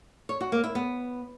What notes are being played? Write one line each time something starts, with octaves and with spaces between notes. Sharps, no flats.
C#5
F#4
A#3
E4
B3